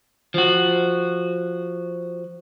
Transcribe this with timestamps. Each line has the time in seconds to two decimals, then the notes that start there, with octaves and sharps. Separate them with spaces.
0.34 F3 F#4